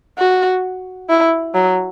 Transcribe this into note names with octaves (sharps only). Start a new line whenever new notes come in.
F#4
E4
F#3